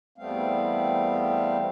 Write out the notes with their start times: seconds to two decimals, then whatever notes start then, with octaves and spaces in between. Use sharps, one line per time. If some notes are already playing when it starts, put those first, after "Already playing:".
0.18 E2 G3 A3 B3 C4 F5